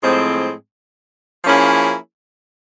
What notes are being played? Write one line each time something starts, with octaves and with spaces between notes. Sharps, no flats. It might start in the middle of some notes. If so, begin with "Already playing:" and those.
A2 F3 G#3 C4
F3 A#3 C#4 E4 G#4